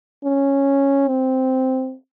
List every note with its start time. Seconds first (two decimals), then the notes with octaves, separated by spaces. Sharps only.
0.24 C#4
1.08 C4